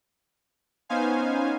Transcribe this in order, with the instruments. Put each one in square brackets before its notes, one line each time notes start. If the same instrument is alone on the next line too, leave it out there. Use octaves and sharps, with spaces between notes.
[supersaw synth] B3 C#4 D#4 C5 F5 G#5